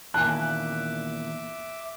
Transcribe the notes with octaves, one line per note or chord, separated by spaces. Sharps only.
E2 A#2 D#3 E5 G#5 A5 D6 F#6